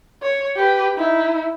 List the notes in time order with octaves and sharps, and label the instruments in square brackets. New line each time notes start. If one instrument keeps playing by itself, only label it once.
[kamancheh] C#5
G4 B4
D#4 E4